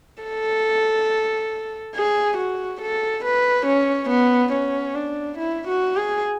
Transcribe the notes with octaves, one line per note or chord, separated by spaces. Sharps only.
A4
G#4
F#4
A4
B4
C#4
B3
C#4
D4
E4
F#4
G#4